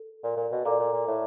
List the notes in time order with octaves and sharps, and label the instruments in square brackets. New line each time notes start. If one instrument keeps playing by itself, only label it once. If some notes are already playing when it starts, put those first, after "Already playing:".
Already playing: [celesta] A4
[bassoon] A#2
A#2
B2
[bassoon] A#2 [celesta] A4 D5 F5 A#5 D6
[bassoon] A#2
A#2
A2